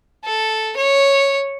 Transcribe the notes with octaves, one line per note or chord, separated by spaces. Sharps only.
A4
C#5